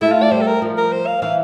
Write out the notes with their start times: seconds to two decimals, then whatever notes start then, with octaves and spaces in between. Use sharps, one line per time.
0.01 A3 E4
0.12 F4
0.22 D5
0.31 G3 C5
0.41 A4
0.47 A#4
0.62 F3
0.77 A#4
0.92 C5
1.07 F5
1.22 E3 F5